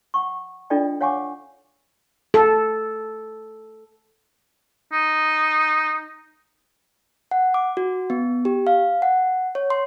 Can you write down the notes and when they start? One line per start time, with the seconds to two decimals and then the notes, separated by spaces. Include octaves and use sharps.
0.14 F#5 C#6
0.70 D4 F4 A4 D5 D#5 G5
1.01 C#5 F5 F#5 G#5 C#6 D6
2.34 A4
4.92 D#4
7.31 F#5
7.54 D6
7.77 F#4
8.10 B3
8.45 G4
8.67 F5
9.02 F#5
9.55 C#5
9.70 C6